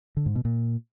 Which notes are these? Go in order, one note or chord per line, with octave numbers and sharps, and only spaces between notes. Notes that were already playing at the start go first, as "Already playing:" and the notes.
D3
G#2
B2
A#2